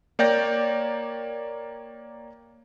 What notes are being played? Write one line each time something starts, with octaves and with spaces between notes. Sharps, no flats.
A#3 C#5 D5 G5 G6 A#6